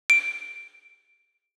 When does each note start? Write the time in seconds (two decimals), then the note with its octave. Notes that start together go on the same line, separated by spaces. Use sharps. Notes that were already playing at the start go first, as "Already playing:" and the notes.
0.10 D7